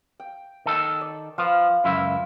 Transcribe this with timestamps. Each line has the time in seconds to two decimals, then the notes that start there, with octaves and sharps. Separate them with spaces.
0.20 G5
0.66 D#3 A4
1.01 D5
1.38 F3 B4 F5
1.84 C#2 F#2 E4 F4 E5